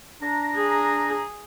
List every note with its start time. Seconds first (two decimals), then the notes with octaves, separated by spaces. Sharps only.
0.21 D4 A#5
0.55 G#4